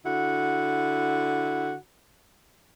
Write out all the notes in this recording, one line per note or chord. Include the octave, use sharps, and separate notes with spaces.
D3 E4 F#4